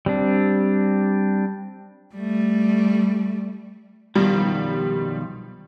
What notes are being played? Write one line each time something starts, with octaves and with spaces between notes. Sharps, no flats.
G3 C4 D4
G3 A3
B1 D#3 F3 G3